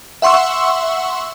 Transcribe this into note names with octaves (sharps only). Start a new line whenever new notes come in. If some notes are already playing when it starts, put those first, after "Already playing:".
E5 F#5 C6 C#6 E6